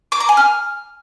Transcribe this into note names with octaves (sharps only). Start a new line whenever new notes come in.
D6
A#5
G#5
F6